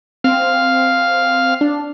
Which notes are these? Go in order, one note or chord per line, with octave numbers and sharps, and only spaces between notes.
C4 F5
D4